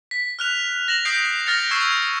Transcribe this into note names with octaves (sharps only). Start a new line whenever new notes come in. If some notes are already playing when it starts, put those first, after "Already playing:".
B6
F6 F#6 F7
A#6 E7 F#7
D#6 G6 A#6 C7 D7
F6 A6 A#6 C#7 F7
C#6 E6 G#6 C7 E7